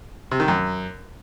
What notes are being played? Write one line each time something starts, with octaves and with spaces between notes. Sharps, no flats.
C3
D#3
F#2